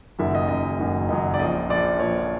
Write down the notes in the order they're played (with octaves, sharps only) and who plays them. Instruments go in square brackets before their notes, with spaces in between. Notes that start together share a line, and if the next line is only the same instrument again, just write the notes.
[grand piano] F#1 F#2 D#3 F#3 E5
D#5
F#1 F#2 D#3 F#3 D#5
F#1 F#2 D#3 F#3
F#1 F#2 D#3 F#3 D#5
D5
A#1 A#2 F3 D#5
A#1 A#2 F3 D5
A#1 A#2 F3 C#5